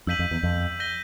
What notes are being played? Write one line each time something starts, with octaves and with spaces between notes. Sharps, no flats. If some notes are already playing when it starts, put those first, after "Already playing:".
F2 E6 G6 B6 D#7 F#7
F2
E2
F2
G6 A#6 D#7 G7